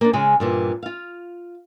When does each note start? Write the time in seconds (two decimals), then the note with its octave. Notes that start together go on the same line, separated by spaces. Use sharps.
0.01 A#3 D4
0.13 C#3 G#3 C#4 G#5
0.40 G2 A#2 E3
0.83 F4 F5